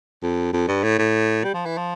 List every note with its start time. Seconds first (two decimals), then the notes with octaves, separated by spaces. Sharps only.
0.23 F2
0.53 F2
0.68 G2
0.83 A2
0.98 A2
1.44 G3
1.54 F3
1.66 E3
1.77 F3